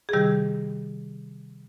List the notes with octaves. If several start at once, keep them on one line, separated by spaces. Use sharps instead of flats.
G#4
C3 D#3 G3 G4